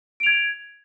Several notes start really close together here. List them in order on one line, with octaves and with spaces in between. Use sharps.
D7 F7 G#6